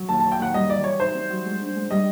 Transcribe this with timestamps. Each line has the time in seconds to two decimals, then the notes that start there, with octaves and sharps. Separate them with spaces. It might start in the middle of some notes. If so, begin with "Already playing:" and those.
Already playing: F#3
0.09 D#2 A5
0.20 D#2 A5
0.32 G5
0.39 D#2 F#5
0.54 G3 D#5
0.70 E3 D5
0.84 E3 C#5
1.00 D#4 C5
1.14 C4
1.30 F#3
1.46 G#3
1.61 D4
1.76 G#3
1.91 G3 D#5